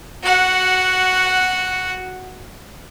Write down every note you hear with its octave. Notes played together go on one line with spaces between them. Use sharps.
F#4 F#5